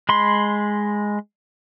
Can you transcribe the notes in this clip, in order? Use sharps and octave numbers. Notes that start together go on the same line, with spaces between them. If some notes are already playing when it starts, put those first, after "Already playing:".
G#3 B5 C6